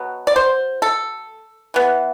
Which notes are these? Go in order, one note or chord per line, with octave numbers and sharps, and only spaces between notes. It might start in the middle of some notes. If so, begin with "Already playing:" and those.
Already playing: B2 F#3 B3
D5
C5
A4
E3 B3